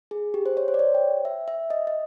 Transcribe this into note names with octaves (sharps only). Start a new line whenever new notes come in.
G#4
G4
C5
C#5
C5
D5
C#5
G5
E5
E5
D#5
D#5